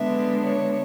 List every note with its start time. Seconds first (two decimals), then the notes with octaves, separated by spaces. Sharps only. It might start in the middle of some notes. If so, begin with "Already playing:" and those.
Already playing: D3 G#3 B3 D4 E5
0.44 C#5